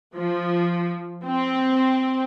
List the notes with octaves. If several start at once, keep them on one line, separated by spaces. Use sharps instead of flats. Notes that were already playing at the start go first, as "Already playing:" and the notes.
F3
C4